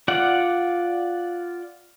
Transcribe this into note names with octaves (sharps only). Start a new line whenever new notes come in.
F4 D5 F#5